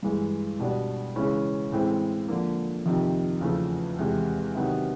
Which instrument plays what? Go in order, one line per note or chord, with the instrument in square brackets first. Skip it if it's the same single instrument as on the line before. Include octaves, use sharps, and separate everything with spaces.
[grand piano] G2 E3 G#3
B2 G3 B3 D4
C#3 E3 G#3 C#4 E4
A2 E3 G#3 C4 E4
D3 F3 A#3
F2 C3 D#3
E2 C#3 F3 A3
E2 C3 E3 G#3
C3 D#3 F#3 B3 D#4